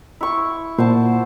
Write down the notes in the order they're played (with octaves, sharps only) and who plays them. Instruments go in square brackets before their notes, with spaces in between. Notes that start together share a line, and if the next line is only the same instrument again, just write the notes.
[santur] E4 C#6
[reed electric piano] A#2 [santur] C5 F#5 A5